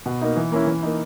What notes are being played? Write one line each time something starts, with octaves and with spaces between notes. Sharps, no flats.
B2
A#3 D#4
E3
A#3 C#4 E4
E3
A#3 D#4